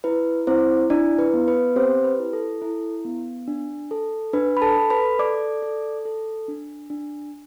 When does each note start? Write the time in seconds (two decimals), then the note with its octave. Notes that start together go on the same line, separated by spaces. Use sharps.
0.04 E4 B4
0.47 C4 E4 C5
0.90 D4 E4 D5
1.19 B4
1.34 B3
1.48 B4
1.76 C4 G4 C5
2.04 B4
2.19 E4
2.33 A4
2.62 E4
3.05 B3
3.47 D4
3.91 A4
4.33 D4 B4
4.57 B5
4.62 A4 A5
4.77 A4
4.90 B4 B5
5.19 A4 D5 D6
5.62 A4
6.05 A4
6.48 D4
6.90 D4